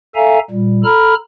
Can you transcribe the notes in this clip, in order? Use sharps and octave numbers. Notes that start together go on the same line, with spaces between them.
A4 E5 F5 G#5 A#5
A#2 G3
A4 A#5 B5 F6